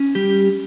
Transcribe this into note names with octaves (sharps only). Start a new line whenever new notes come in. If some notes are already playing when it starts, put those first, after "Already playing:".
Already playing: C#4
G3 G4